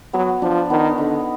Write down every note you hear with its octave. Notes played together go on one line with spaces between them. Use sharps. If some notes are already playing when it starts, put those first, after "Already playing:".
F#3 B3
F3 D4
D#3 B3
D3 D#4